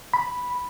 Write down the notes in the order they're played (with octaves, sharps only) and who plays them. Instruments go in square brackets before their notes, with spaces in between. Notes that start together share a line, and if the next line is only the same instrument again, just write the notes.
[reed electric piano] B5